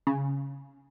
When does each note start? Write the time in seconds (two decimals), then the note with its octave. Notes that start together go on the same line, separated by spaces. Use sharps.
0.07 C#3